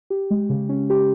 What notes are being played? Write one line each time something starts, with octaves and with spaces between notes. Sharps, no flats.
G4
G#3
C#3
C#4
G4